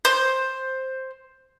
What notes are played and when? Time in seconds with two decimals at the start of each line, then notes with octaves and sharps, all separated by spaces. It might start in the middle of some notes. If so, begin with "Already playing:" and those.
0.05 C5